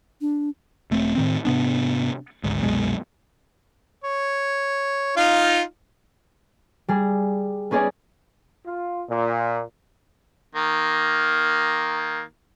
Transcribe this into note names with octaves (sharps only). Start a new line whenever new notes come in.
D4
E1 A3 C4
A2 D#3 C4
G#2 C3 B3 D4
G#1 D2 G#2
C2 F#2 B2 G#3
C#5
D#4 F4 F5
G3 G#4
B3 C#4 G#4 D5 D#5 G#5
F4
A#2
D#3 A#3